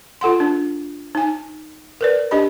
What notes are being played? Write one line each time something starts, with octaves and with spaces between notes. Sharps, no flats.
F4 A4 F#5 C6
D4
D#4 G#5
A#4 B4 D5
D4 G4 D#5 B5